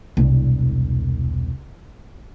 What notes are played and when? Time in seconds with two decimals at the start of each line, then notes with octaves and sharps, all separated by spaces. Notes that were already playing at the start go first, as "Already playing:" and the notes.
0.17 E1 C2